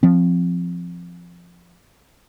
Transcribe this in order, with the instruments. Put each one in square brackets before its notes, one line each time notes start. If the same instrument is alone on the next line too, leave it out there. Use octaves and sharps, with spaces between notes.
[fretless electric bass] F3 C4